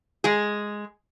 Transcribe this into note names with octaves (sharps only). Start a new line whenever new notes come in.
G#3 G#4